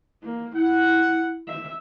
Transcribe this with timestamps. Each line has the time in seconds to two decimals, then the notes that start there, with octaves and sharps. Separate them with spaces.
0.24 A#3
0.56 E4 F#5
1.48 E5